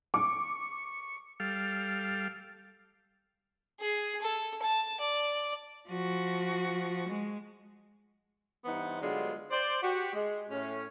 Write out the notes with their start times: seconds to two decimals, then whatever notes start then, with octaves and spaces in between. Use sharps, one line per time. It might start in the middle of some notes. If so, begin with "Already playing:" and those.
0.14 C#6 D6
1.40 G3 A4 F5
3.80 G#4
4.22 A4
4.63 A5
5.00 D5
5.89 F3 F#4
7.09 G#3
8.65 G2 E3 B3 D#4 C5 F#5
9.00 G2 D3 F#3 G#3 B3 F4
9.51 C5 D5
9.82 F#4 G4
10.13 G#3
10.49 A2 C#4